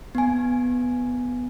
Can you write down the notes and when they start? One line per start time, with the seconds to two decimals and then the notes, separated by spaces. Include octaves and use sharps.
0.15 B3 G#5